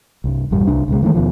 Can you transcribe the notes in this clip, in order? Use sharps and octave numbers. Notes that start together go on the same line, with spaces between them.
C2 G2
A#1 E2 G2 G3
C2 D4
C#2 B2 G#3
D#3 E3 G#3 A3
D#2 B2 D#3 F3